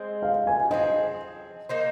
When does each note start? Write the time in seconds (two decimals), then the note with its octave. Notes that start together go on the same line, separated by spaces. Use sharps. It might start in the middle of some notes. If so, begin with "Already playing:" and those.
Already playing: G#3 C4 G#4 C5
0.22 F5
0.47 G#5
0.71 F3 C4 G#4 D#5
1.69 A#3 D#4 C5